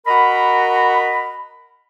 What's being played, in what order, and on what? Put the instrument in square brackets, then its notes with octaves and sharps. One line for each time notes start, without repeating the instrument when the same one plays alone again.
[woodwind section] F#4 A#4 D#5 A#5 B5